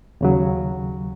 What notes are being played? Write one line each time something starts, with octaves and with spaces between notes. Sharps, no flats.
D#2 C#3 F#3